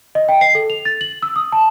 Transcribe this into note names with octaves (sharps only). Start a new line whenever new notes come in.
D#5
G5
C7
A4
F7
A6
F#7
E6
D#6
A5